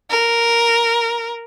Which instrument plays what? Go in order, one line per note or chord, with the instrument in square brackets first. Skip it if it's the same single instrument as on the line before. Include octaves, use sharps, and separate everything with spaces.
[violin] A#4